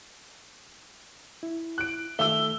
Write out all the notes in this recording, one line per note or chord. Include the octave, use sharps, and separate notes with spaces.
E4
F#6 D7
D#3 A3 A4 E5 E6 G7